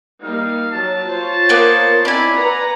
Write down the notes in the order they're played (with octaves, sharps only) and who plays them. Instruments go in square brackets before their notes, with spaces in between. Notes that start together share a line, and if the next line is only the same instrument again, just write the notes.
[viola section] G3 A#3 D#4 [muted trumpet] F5
[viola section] F#3 [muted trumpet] A5
[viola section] F4 C5 C#5
[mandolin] A#3 B3
[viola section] C4 D#4 E4 [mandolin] D5 G#5 [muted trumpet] B5
[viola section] B4 F#5 A#5